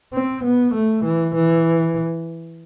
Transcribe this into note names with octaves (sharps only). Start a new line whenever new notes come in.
C4
B3
A3
E3
E3